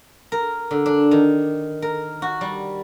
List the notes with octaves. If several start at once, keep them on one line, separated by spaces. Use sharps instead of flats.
A#4
D3
D4
D#3
A#4
F#4
G3